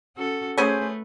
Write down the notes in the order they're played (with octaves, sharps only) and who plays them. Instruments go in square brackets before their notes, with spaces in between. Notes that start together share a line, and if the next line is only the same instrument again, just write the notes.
[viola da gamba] C#4 F#4 A4
[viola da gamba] A3 B4 [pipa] C#4 G#4 C5